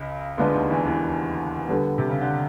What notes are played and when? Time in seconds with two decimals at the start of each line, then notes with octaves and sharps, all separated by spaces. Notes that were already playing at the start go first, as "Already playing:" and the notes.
Already playing: C#2 C#3
0.37 D2 D3 G#3 B3 D4 F4
0.54 D#2 D#3
0.71 E2 E3
0.86 E2 E3
1.68 D3 G3 B3
1.98 C3
2.10 C#3
2.21 D3